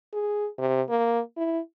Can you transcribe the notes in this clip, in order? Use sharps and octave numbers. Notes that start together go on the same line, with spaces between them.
G#4
C3
A#3
E4